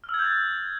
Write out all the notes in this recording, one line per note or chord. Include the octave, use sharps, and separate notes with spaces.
F6
E6
G#6
G6
A6